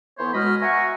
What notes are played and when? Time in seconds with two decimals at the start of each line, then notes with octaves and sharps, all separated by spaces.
0.18 E3 B3 A4 C5 C#5 E5
0.34 B2 G#3 F#4 D#5 B5 F6
0.61 E5 F#5 G#5 A#5 C#6